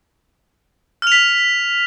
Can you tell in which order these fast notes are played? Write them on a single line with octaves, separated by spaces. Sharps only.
F6 F7 B6